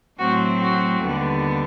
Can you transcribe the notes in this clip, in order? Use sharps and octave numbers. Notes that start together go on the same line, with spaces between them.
A2 F#3 A3 C4 F#4
F#4
D#2 D3 G3 B3